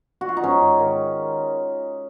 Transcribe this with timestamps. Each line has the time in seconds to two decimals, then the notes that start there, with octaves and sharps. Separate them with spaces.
0.21 F#4
0.29 F4
0.37 D#4
0.44 G#2 C#4
0.62 G#2
0.79 D#3